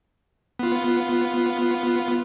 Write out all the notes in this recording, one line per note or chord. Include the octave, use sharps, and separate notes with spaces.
B3 F4